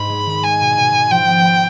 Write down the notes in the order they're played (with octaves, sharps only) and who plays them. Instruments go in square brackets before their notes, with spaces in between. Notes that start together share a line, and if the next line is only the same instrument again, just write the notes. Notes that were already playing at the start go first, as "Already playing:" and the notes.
Already playing: [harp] G#2 [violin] B5
[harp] G#3
D#3
[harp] G#3 [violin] G#5
[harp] B2
B2
B2
[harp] F3 [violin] G5
[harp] B3
B3